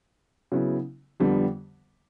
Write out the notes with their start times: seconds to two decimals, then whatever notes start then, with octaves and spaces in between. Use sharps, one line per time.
0.52 C#3 F#3 B3 E4
1.20 F2 D3 G3 B3